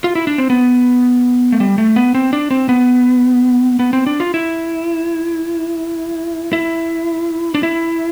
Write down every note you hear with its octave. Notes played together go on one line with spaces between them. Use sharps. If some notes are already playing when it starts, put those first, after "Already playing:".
F4
E4
D4
C4
B3
A3
G3
A3
B3
C4
D4
C4
B3
B3
C4
D4
F4
E4
E4
D4
E4